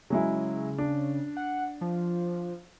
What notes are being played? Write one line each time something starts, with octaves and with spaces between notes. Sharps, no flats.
C#3 F#3 G#3 E4
D4
F#5
F3